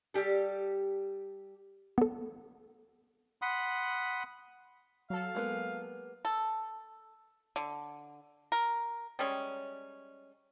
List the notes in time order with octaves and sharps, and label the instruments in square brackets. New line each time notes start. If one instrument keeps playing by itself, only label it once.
[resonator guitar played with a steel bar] G3 G4 A4
[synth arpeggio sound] B3 A4
[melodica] F#5 B5 C6 D#6
[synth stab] F#3 A4 [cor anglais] F5
[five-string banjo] G#3 A#3 B3
[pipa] A4
D3
A#4
G3 G#3 C#4